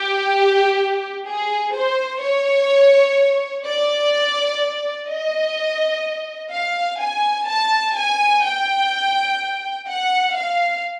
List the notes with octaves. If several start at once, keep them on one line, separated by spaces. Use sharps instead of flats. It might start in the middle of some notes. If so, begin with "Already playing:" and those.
Already playing: G4
G#4
C5
C#5
D5
D#5
F5
G#5
A5
G#5
G5
F#5
F5